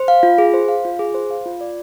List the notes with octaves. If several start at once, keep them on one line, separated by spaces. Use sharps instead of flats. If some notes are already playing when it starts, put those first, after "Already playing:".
Already playing: C5
F5
F4
G#4
C5
F5
F4
G#4
C5
F5
F4
D5